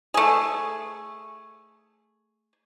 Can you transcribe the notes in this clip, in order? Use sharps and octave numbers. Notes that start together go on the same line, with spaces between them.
A3 G#4